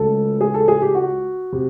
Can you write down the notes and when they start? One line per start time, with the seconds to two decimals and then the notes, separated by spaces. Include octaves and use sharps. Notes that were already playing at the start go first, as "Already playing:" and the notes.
Already playing: C#2 C#3 F#3 A3 A4
0.41 G#4
0.54 A4
0.68 G#4
0.82 G4
0.95 F#4
1.53 C3